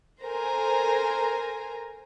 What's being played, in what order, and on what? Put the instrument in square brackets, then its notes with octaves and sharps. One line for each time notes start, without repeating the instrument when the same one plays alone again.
[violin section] A4 A#4 C5 G#5 A#5